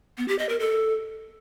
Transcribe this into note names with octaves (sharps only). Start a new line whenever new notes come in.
B3
G4
D#5
A#4
A4